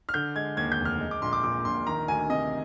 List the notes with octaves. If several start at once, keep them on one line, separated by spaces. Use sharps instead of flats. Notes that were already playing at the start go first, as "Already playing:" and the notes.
F6
D3 G6
G#3 G#6
D#2 G#6
G6
F1
F6
G#3
D6
A#1 C6
D6
A#2 D6
A#1 C6
D#3 A#5
D2 G#5
C3 D#5